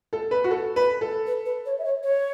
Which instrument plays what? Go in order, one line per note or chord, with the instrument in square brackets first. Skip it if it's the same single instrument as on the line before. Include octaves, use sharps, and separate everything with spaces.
[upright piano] A4
B4
F#4
A4
B4
A4
[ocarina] B4
B4
C#5
E5
C#5
C#5